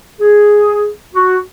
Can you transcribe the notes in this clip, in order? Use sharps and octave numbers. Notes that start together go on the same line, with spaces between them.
G#4
F#4